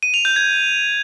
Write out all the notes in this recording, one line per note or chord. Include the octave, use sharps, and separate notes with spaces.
D#7
F7
G6
G#6